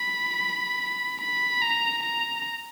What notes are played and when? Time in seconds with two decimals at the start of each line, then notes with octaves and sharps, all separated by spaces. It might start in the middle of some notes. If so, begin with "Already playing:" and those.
Already playing: B5
1.21 B5
1.61 A#5
2.03 A#5